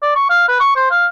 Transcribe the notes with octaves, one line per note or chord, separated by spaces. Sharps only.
D5
C#6
F5
B4
C#6
C5
F5